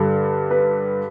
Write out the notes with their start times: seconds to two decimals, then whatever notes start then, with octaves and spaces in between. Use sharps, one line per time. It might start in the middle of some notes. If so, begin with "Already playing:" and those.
Already playing: G2 D3 G3
0.51 B4